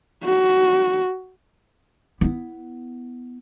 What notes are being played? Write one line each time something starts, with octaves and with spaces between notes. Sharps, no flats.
F#4
B3 E4